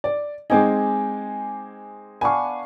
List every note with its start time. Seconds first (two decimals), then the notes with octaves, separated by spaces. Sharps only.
0.04 D5
0.50 G#3 C4 D#4 G#5 D6
2.21 B3 D4 F5 G#5 C#6